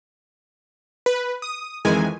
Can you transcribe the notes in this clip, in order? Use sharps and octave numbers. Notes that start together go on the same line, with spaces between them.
B4
D#6
F2 D#3 E3 G#3 G#5